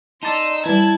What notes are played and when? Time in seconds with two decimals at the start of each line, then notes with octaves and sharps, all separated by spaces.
0.23 D#4 D5 A5 C6 E6
0.66 E3 G3 E4 A5 G#6